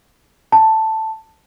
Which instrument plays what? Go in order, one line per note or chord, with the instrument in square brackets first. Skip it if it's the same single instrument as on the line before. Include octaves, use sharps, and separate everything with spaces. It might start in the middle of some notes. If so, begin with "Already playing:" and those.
[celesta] A5